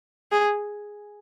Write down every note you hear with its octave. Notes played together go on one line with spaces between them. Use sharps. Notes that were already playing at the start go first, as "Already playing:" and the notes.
G#4